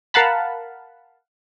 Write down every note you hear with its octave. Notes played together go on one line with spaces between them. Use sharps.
A#4 F5 F#5 A5 B5